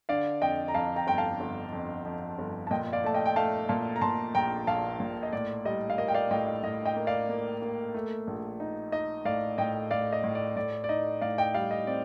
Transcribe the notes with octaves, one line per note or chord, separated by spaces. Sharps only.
D3 D5 F5
F2 D#5 G5
A#5
F2 F5 A5
G5 A#5
G1 G5
F5 A5
G1
F2
F2
G1
A5
A#2 D#5 G5
D5 F5
A3 A5
D#5 G5
G5
A3 F5 A5
A#2 F5 A5
A#5
A#2 A5 C6
A#1 G5 A#5
A#1 F5 A5
A#2
D#5
A2 D5
G3 D#5
F5
A#3 D#5
G5
D5 F5
A2 D#5 G5
D#5
A2 D#5
D#5 G5
A#3
D5 F5
A#3
A#3
A3
A#1
D#4
D#4 D#5
A2 D5 F5
A2 D#5 G5
A2 D5 F5
D#5
A2
D5
A2 D5
D5
D#4 D#5
A2 D5 F5
D#5 G5
G3 D5 F5
D#5
C4 D5